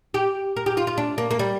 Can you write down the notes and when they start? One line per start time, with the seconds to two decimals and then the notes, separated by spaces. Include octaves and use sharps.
0.14 G4
0.57 A#4
0.66 G4
0.77 F4
0.87 F4
0.98 D4
1.18 A#3
1.31 A#3
1.39 G3